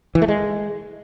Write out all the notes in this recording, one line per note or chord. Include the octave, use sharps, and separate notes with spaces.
E3
A3
G#3